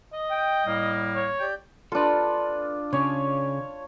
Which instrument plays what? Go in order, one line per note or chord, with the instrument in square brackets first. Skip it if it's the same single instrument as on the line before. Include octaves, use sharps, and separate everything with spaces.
[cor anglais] D#5
[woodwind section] G5
A2 G3 A#3
[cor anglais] C#5
[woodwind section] G4 D5 G5
[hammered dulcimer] D4 F4 [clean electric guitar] A4 B4
[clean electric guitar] C#3 C#4 [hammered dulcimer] C#5